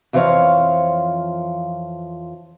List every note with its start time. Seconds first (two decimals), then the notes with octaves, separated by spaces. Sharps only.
0.13 F2 E3 F3 C5 C#5 F5